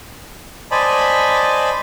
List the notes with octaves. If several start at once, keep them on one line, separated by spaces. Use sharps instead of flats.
C5 D5 D#5 G#5 A5 B5